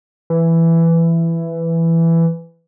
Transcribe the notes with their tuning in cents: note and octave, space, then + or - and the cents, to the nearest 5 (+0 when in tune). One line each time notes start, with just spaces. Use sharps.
E3 +10